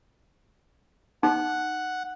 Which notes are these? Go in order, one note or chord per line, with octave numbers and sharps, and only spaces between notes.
D#4 F#5